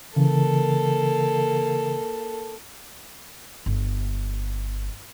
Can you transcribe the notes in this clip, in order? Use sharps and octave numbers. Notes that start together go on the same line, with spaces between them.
C#3 E3 A#3 A4
G1